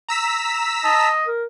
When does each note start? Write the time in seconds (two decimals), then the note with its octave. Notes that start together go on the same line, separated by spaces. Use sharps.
0.09 A#5 E6 B6
0.84 D#5 A5
1.27 A#4